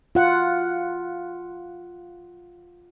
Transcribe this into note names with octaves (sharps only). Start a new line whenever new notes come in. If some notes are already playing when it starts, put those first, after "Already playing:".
F4 F#5